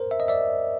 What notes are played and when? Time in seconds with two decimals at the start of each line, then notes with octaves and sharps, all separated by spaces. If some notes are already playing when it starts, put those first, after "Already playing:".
Already playing: A#4 C5
0.11 E5
0.20 D#5
0.28 D5 E5